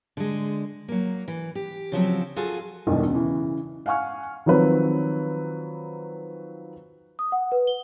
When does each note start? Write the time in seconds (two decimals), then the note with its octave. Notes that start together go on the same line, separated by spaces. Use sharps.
0.17 D3 G#3
0.88 F#3 A#3
1.28 E3
1.55 G4
1.92 C#3 F3 F#3 C4
2.36 F4 F#4 G#4 A4
2.87 E1 B1 G2 B2 D#3 E3
3.11 C#3 E3
3.86 F5 F#5 G#5 C#6 F6
4.46 D#3 F3 F#3 C4 B4
7.19 D#6
7.32 F#5
7.52 B4
7.67 G7